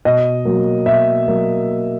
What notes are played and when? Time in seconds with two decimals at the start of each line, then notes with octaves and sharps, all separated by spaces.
0.05 B2 D#5
0.45 F#3 A#3
0.86 B2 E5
1.28 F#3 A#3